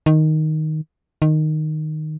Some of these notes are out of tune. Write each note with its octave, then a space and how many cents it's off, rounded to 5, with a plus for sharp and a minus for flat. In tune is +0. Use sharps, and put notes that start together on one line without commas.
D#3 +0
D#3 -10